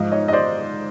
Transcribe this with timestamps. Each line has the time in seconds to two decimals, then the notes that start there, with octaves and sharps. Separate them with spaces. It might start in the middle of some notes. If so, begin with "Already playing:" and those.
Already playing: G#2 F3 D#5 F5
0.12 C#5 D#5
0.28 D#5
0.33 C5 D5